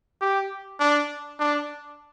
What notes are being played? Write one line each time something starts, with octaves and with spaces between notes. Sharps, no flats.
G4
D4
D4